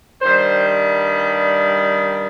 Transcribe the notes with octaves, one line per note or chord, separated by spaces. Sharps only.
G2 D#3 G3 C5